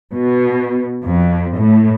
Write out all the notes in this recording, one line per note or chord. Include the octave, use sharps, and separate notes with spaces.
B2
F2
A2